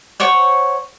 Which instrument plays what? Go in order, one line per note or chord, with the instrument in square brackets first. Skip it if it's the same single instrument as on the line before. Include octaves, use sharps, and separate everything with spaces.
[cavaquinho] C5 C#5 F#5 C#6